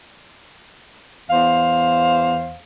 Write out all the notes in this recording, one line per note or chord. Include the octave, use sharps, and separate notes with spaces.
E2 C5 F5